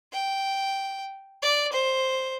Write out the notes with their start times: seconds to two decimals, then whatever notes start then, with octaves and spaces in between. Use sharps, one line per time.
0.13 G5
1.42 D5
1.73 C5